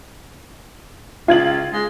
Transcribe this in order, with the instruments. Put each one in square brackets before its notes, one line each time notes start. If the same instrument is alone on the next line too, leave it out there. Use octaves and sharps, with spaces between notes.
[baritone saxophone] C#2 [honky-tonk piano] F4 G#6 F#7
[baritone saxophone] G#3